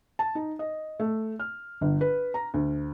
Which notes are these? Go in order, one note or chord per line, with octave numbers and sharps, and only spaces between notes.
A5
D#4
D#5
A3
F6
G1
B4
A#5
D2